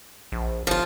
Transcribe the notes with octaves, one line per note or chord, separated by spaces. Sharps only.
A#1
G1 F3 F4